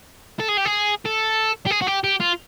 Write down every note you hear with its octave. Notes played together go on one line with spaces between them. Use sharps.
A4
G#4
G4
G#4
A4
G4
G#4
F#4
G4
G4
F4